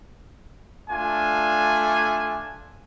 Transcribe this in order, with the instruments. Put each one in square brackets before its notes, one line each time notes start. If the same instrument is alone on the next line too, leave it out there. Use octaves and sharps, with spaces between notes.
[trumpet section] A3 D4 F4 G#5